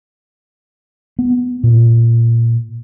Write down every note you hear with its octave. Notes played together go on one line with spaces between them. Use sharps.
B3
A#2